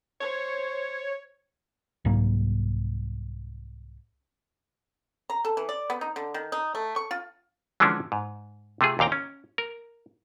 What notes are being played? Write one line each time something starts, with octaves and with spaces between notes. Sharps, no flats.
C5 C#5
C2 G#2 F#3 A#3
A#5
A4
E3
D5
B3
D#4
D3
D#3
D#4
A3
C#6
F4
D3 E3 F3 G#3 C#4 D4
G#2
C3 A3 F4 G#4
D#2 A#2 F5 G5 A#5
C#4
A#4